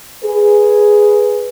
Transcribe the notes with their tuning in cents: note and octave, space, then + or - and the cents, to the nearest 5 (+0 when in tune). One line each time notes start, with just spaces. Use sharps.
G#4 +0 B4 +0